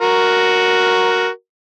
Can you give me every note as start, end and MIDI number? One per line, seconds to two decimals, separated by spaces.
0.01 1.28 66
0.01 1.28 70